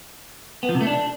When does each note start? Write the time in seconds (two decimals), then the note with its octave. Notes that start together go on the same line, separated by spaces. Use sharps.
0.63 B3
0.69 F3
0.75 C3
0.81 A3
0.87 D4